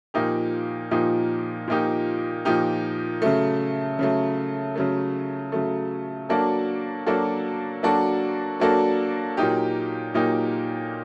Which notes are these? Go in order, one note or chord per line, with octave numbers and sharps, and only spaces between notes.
A#2 F3 A#3 D#4 G4
A#2 F3 A#3 D#4 G4
A#2 F3 A#3 D#4 G4
A#2 F3 A#3 D#4 G4
C#3 F#3 A3
C#3 F#3 A3
C#3 F#3 A3
C#3 F#3 A3
F#3 A#3 D4 F#4 A4
F#3 A#3 D4 F#4 A4
F#3 A#3 D4 F#4 A4
F#3 A#3 D4 F#4 A4
A#2 F#3 A#3 D#4 G4
A#2 F#3 A#3 D#4 G4